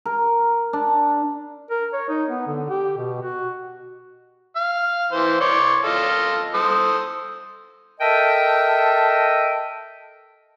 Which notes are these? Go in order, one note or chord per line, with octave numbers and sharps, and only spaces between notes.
A#4
D4
A#4
C#5
D#4
B3
D3
G4
B2
F#4
F5
E3 C5
C#5 D5 C6
F4 A4 D#5
A4 C5 D#6
A4 A#4 D#5 E5 G5 A5